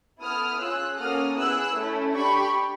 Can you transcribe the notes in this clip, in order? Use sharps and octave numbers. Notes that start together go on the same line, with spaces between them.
B3 E4 A4 D#6 F6
C#4 F4 G#4 E6 F#6
A#3 C#4 F#4 A4 D#6 F6
B3 E4 G#4 E6 F#6
A3 C#4 E4
D4 G4 B5 C#6